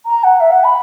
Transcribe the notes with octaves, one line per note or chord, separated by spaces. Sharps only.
A#5
F#5
E5
F#5
B5